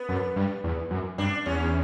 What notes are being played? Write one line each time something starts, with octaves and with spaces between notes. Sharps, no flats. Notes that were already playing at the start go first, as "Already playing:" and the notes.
Already playing: B3
F#2
G2
E2
F#2
G2 D4
E2 C#4